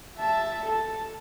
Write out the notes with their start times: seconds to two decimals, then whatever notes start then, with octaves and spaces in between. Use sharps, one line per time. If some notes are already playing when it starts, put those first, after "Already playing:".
0.18 E5 A5
0.64 A4 A5